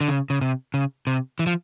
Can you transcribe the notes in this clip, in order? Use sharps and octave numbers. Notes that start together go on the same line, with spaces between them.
D3
C#3
C#3
C3
C#3
C3
E3
F3